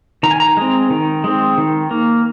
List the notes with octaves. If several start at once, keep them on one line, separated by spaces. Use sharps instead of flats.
D#3 A#5
G#5
A#5
G#3 C4
D#3
G#3 C4
D#3
A#3